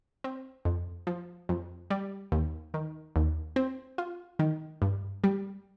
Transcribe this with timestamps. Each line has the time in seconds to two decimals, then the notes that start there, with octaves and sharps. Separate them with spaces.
0.24 C4
0.65 F2
1.07 F3
1.49 F2
1.90 G3
2.32 D#2
2.74 D#3
3.16 D#2
3.56 C4
3.98 F4
4.39 D#3
4.82 G2
5.24 G3